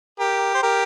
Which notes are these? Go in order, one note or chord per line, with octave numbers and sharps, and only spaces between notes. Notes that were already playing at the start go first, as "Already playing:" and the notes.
G4 A#4
C5
G4 A#4